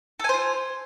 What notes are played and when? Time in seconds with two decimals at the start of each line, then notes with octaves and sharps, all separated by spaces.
0.20 A4
0.24 G#5
0.29 C5
0.34 F4